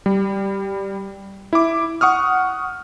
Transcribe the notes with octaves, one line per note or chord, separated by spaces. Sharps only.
G3
E4 D6
F#5 C#6 D#6 F6